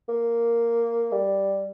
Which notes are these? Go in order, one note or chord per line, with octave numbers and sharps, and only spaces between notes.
A#3
G3